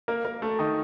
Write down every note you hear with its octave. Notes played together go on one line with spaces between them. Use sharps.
A#3 A#4
A#3 A#4
A3 A4
D#3 D#4